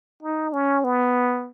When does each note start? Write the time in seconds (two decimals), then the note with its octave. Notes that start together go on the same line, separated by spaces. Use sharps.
0.23 D#4
0.53 C#4
0.84 B3